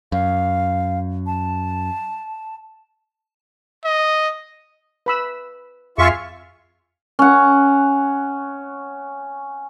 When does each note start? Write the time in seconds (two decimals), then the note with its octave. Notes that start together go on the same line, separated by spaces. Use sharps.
0.12 F#2 F5
1.27 A5
3.85 D#5
5.06 B4 B5 E6
5.98 F2 F4 G#4 E5 F5 G#5 C#6
7.19 C#4 F#5